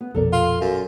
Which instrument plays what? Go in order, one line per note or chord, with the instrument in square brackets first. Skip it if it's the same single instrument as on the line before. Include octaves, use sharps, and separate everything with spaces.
[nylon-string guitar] B3
[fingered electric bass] A#1 F2 B2 [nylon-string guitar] A4 A#4 D5
[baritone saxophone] F4
F#2